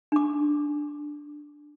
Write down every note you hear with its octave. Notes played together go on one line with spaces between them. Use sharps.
D4 D6